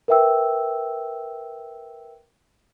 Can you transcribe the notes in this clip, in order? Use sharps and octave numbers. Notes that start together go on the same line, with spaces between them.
A#4 B4 E5 G5 E6